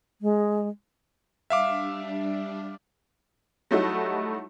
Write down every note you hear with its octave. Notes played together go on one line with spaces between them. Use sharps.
G#3
G3 D4 E5 F5 D6
F#3 G3 A3 D#4 E4 F#4